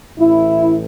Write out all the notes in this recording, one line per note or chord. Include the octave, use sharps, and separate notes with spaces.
A1 A2 E3 E4